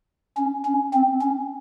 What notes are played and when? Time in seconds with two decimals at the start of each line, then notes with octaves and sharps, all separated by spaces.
0.37 C#4
0.65 C#4
0.94 C4
1.22 C#4